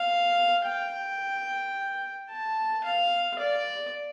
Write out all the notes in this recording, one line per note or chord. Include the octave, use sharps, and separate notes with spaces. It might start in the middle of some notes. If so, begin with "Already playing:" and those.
Already playing: F5
G5
A5
F5
D5